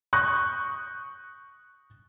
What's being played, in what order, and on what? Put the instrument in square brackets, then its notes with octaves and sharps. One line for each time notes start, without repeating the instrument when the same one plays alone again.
[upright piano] C#6 D#6 F#6 G6 A#6